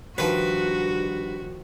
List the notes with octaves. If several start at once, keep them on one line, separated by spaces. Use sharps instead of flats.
G2 D#3 F3 F#4 B4